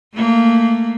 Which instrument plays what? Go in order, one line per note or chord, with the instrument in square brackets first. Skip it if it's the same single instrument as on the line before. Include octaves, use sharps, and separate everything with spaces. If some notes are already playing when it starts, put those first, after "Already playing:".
[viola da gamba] A3 A#3